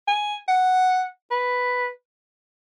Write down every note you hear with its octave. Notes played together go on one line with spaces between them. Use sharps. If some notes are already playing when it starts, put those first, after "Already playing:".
G#5
F#5
B4